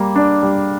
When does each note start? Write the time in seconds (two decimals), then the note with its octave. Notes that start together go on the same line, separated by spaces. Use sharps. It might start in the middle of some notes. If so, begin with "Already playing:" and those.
Already playing: G3 A#3
0.16 D4
0.42 G3